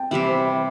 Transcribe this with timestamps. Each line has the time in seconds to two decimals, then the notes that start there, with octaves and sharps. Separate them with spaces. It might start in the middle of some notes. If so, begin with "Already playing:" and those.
Already playing: G5 A5
0.11 C3 E3 G3 E4 E5
0.28 C5
0.46 E5